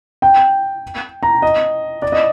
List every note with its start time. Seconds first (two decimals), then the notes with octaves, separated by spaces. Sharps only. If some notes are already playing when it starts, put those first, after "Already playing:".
0.22 G5
1.23 A#5
1.42 D#5
2.02 D5
2.12 D#5